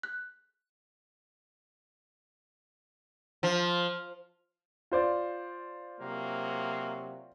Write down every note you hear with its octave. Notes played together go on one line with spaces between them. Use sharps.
F#6
F3
F4 C5 D5
C3 F#3 A#3